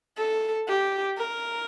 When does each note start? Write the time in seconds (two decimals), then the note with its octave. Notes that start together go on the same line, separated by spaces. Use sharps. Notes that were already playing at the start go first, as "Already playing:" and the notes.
0.17 A4
0.68 G4
1.18 A#4